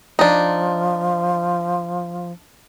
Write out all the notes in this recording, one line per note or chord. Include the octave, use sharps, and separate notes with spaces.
F3 D4 D#4